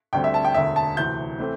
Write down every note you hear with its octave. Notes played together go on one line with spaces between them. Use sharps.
D2 D3 G3 C4 G5
E5
A5
G5
E1 D2 D3 E5
A5
D2 C3 E3 G6
E3 A3 C4